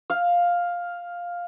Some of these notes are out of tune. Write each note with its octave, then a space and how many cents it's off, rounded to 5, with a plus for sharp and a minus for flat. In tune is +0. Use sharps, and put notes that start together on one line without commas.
F5 +5